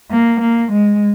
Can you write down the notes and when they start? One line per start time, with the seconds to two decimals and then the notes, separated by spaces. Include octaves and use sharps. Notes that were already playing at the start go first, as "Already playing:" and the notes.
0.11 A#3
0.41 A#3
0.72 G#3